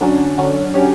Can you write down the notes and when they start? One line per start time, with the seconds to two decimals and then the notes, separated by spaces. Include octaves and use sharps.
0.01 D3 F#3 C#4 D4
0.38 D3 F#3 C#4
0.74 D3 F#3 C#4 G4